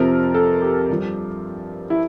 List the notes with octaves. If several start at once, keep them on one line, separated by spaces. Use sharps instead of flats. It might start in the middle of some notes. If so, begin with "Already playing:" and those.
Already playing: F2 C3 F3 A#4
A4
G4
G2 F3
E4